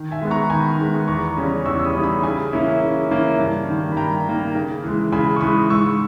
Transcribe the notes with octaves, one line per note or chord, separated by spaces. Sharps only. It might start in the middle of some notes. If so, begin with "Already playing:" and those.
Already playing: D#3
E5 G#5
G#3 B3
A#5 C#6
D#3 G#5 B5
G#3 B3
E2 A#5 C#6
C#3 G3 C#4
E2 C#6 E6
E6
B5 D#6
C#3 G3 C#4
B5 D#6
C#3 G#5 B5
E3 A#3 C#4 E4
C#3
E3 A#3 C#4 E4
G2
D#3 A#3
B5
G2 G5 A#5
D#3 A#3
C#3
E3 G#3
C#3 G#5 B5
C#6
E3 G#3 B5 D#6
G#2 C#6 E6